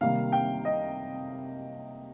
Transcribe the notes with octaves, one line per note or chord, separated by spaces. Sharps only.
C3 D#3 G3 A#3 F5
G5
D#5